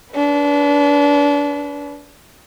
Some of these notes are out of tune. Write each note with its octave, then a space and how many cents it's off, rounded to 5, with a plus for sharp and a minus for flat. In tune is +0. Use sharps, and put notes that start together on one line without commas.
D4 -30 B4 -15